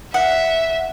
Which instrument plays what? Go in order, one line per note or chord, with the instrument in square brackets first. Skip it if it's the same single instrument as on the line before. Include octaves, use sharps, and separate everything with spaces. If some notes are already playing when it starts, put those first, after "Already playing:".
[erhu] E5 [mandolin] F#5